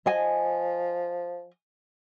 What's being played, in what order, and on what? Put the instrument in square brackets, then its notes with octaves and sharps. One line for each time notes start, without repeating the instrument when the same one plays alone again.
[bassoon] F3 [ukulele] D#5 G#5